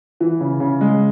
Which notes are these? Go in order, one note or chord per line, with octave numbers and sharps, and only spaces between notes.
E3
C#3
C#3
G#3